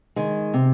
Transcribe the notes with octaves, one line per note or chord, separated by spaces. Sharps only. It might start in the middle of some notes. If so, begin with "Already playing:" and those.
D#3 G#3
C3